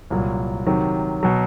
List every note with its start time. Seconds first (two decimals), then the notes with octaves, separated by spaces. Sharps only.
0.10 C2 A#2 F#3
0.66 C3 D#3 F#3
1.23 B2 F#3